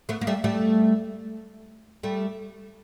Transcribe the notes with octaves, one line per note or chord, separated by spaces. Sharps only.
A3 B3
A#3
G3 A3
G3 A3
G3 A3